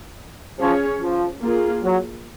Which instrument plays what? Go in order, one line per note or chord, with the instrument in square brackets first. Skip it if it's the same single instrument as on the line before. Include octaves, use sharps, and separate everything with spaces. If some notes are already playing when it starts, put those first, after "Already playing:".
[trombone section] F3 [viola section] C#4 G#4 C#5
[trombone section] F3
[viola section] A#3 F4 G#4
[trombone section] F#3